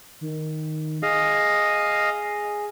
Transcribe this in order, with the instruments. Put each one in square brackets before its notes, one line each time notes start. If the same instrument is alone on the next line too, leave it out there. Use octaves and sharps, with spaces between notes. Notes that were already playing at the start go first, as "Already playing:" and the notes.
[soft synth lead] D#3
[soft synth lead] G#4 [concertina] D#5 F5